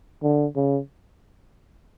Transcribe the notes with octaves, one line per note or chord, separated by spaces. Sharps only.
D3
C#3